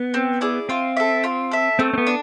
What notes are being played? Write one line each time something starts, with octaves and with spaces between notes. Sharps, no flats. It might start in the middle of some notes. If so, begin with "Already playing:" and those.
Already playing: B3
C4
E4 G#4 D5
C4 F4
A4 E5
F4
A4 E5
A3 C4
C4
B3
D4